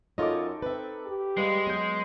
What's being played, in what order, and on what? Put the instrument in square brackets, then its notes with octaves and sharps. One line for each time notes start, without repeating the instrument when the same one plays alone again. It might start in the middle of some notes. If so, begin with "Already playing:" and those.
[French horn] F#2 [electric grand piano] D#4 A4 D6 [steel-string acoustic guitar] F4 C#5 D#5
[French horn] C4 [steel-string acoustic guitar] B4 E5
[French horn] G4
[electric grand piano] G3 B4 F5 [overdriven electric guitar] G#3
[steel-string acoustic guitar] F#3 B3 [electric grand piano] C#5 G6